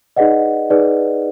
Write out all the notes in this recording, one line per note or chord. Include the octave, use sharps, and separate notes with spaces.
D#4 G#4 B4 D5 D#5 F#5
D#4 G#4 B4 D5